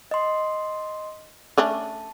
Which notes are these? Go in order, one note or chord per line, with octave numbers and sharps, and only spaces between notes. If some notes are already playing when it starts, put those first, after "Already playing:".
D#5 C6
A3 C#4 D4 A5